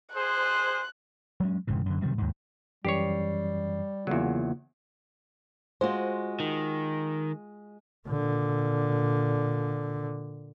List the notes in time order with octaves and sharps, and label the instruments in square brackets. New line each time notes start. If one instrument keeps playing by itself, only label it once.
[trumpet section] G#4 C5 [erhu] F#6
[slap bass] F#3 G#3 C#4
E1 G#2 C#3 E3
F#2 D3
C3 D#3 F#3 G3
D#2 G#2
[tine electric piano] F#2 E3 C7 [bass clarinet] G3 [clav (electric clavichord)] G4 C#5
[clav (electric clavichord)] E2 F#3 [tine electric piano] C#3 A#3 F4
[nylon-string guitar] G#3 F4 F#4 [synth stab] C5
[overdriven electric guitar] D#3
[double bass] A#2 D3